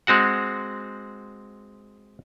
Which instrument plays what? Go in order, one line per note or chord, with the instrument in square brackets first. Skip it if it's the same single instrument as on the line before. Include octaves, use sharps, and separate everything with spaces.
[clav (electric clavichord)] G#3 C4 F#4 F#5